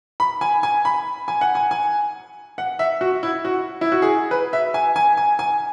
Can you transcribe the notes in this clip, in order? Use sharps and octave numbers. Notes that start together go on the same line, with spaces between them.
B5
G#5
G#5
B5
G#5
F#5
G#5
G#5
F#5
E5
F#4
E4
F#4
E4
F#4
G#4
B4
E5
G#5
G#5
G#5
G#5